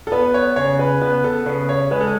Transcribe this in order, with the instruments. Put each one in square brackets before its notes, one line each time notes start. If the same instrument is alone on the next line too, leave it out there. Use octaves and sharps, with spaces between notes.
[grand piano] A4
[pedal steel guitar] B3 [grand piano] B4
[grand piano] C#5
[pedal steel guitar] C#3 [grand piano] C#5
[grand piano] B4
[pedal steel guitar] B3 [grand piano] B4
[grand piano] A4
[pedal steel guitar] C#3 [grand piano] B4
[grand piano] C#5
[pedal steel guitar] G#3 [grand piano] B4
[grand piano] A4